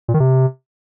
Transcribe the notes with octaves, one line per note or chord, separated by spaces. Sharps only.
A#2
D#3
C3